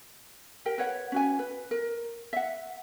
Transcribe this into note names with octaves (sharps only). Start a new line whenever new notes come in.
G4 A#4 G5
B4 C#5 F#5
C#4 F#4 G#5
B4
A#4
E5 F#5